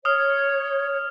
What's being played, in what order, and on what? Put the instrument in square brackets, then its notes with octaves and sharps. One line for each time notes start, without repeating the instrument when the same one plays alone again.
[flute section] C#5 [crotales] D#6 F6